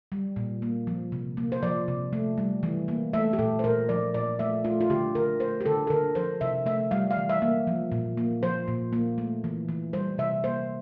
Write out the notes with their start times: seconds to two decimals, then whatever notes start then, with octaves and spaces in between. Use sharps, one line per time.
0.12 G3
0.36 A#2
0.62 A#3
0.87 F3
1.12 C3
1.37 A#3
1.52 C5
1.63 F3 D5
1.88 C3
2.13 A3
2.38 G3
2.63 E3
2.88 A#3
3.13 A3 E5
3.33 G4
3.39 A#2 A4
3.59 C5
3.64 A#2 A#4
3.89 F3 D5
4.14 A#2 D5
4.39 A3 E5
4.64 A3 F4
4.81 F4
4.90 D3 G4
5.15 D3 A#4
5.40 A3 C5
5.61 G4
5.66 D3 A4
5.87 A4
5.90 D3 A#4
6.15 F3 C5
6.41 C3 E5
6.66 A3 E5
6.91 G3 F5
7.11 F5
7.17 E3
7.29 E5
7.42 A#3
7.67 F3
7.92 A#2
8.17 A#3
8.43 F3 C5
8.68 A#2
8.93 A#3
9.18 A3
9.44 E3
9.69 E3
9.93 G3 C5
10.18 C3 E5
10.44 A#3 C5